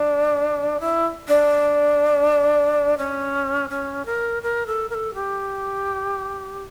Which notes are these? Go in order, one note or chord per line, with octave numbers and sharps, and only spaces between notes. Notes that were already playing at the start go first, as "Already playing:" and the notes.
Already playing: D4
E4
D4
C#4
C#4
A#4
A#4
A4
A#4
A4
G4